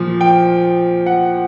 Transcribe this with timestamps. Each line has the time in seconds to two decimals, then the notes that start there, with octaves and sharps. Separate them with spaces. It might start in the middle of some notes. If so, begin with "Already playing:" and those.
Already playing: A#2 F3
0.21 G5
1.06 F#5